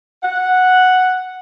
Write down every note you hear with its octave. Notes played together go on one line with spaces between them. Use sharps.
F#5